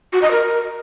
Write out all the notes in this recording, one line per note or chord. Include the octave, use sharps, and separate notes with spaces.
F#4
D#5
A#4